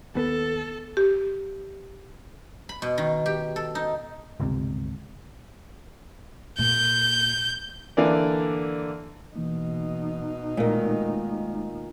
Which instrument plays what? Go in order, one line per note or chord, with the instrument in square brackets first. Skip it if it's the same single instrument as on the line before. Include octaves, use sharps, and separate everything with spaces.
[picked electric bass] D#2 B3 [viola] A4
[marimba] G4
[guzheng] B5
B2
D#3
G4
A4
D#4
[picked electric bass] G1 C#2 C3
[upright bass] A#2 [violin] G6
[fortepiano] D3 E3 A#3 D5
[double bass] B2 D#4 [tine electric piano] E3 A#3
[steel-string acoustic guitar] A#2 D#3 [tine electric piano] G#3 A3